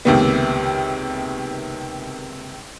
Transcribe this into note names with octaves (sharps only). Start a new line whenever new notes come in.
C#2 C3 D#3 A#3 B3